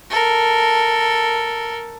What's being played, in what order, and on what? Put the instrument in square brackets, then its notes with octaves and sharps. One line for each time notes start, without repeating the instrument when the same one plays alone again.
[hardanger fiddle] A4 A#4